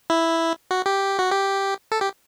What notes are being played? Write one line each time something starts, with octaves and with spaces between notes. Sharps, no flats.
E4
F#4
G4
F#4
G4
A4
G4